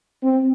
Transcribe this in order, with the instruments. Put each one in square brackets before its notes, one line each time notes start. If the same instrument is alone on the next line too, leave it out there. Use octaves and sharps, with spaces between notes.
[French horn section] C4